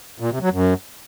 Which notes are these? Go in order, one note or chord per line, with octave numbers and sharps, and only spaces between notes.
A#2
C3
F#3
F#2